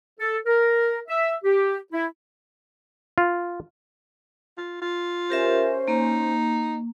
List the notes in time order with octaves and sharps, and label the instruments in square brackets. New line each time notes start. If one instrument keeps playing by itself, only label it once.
[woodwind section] A4
A#4
E5
G4
E4
[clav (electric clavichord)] F4
[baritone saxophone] F4
F4
[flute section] C#4 C5 [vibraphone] G4 A#4 E5
[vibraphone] A#3 [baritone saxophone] D#4